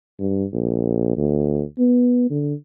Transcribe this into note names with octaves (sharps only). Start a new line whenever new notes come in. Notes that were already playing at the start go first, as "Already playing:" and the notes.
G2
A#1
D2
B3
D3